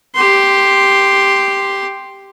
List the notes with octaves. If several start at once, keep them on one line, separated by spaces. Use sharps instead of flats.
G4 C6